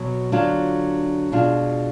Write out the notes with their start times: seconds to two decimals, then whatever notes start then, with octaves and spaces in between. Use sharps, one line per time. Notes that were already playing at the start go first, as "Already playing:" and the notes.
Already playing: B2 F#3 F#4
0.32 D3 F#3 D4 F4
1.32 B2 G#3 D4 F4